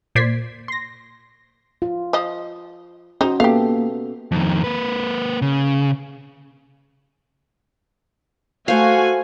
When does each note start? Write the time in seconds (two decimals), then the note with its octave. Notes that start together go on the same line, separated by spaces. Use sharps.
0.15 A#2 C5 D5 G#6 B6 C7
0.68 C6 A#6
1.82 F4
2.13 F3 D#5
3.21 C#4 D#4 F#4 C5
3.40 A#3 B3 G4 A4 E5 F5
4.32 F2 D#3
4.64 A#3 B4
5.42 C#3
8.68 A3 F#4 C5 F5 G#5